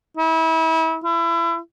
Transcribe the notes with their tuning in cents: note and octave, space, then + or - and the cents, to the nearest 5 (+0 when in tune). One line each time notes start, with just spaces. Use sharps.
E4 -30
E4 +30